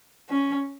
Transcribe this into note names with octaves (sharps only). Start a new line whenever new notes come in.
C#4